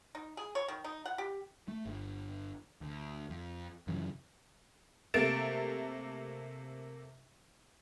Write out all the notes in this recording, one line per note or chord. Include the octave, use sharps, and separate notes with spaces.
D#4
G#4
C#5
D#3
D#4
F#5
G4
A3
G1
D2
F2
F#2 C#3 E3 F3
C3 A3 A#3 A6 D7 E7